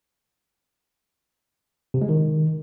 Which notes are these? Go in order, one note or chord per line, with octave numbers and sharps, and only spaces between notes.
C3
G#3
D#3